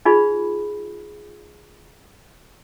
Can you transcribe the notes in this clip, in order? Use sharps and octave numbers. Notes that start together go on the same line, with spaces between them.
D#4 F4 G#4 D5 B5